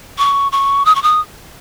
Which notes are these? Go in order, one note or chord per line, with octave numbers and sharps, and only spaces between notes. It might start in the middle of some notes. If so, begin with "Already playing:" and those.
C#6
C#6
D#6
C#6
D#6